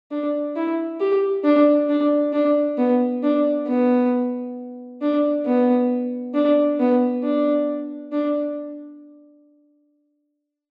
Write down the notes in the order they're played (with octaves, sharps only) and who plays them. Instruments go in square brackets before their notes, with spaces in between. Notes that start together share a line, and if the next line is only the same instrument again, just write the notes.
[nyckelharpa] D4
E4
G4
D4
D4
D4
B3
D4
B3
D4
B3
D4
B3
D4
D4